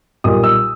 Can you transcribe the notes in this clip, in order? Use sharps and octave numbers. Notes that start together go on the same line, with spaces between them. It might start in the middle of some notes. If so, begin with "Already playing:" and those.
B1 A#2 G3 D#6
E6